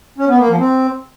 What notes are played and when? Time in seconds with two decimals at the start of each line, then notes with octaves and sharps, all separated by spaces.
0.18 C#4
0.28 B3
0.39 A#3
0.49 F3
0.59 C4